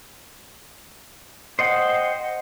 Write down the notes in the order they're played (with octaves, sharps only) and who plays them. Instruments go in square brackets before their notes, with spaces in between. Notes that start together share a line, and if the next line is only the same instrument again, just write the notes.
[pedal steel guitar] C5 D#5 F#5 G5